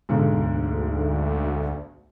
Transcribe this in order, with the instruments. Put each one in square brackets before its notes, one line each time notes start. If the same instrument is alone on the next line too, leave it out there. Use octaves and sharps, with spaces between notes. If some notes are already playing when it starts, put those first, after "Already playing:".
[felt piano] B1 G#2 D3
[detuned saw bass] D2